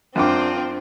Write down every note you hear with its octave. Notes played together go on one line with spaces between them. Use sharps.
F#2 C4 D4 F4 G5 D6